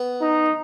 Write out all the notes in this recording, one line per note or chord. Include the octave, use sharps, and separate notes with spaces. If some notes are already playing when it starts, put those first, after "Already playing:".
Already playing: B3
D#4